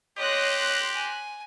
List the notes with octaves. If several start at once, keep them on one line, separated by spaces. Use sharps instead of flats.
G4 C#5 D#5 C6 F#6 A#6
G#5